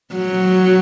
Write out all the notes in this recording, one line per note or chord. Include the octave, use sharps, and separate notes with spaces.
F#3